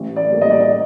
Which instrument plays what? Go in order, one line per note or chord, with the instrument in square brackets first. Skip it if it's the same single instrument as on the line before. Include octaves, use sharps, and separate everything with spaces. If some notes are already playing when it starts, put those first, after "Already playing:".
Already playing: [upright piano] A1
D5
A2 G3 A#3
D#5
D5
D#5